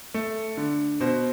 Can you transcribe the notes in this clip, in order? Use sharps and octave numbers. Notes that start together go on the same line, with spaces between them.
A3
D3
B2 C5